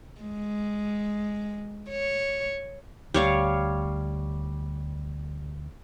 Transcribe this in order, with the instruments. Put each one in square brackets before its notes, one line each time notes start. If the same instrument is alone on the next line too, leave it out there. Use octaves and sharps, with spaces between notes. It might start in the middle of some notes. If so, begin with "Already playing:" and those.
[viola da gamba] G#3
C#5
[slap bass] D2 [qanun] G3 C#5 F5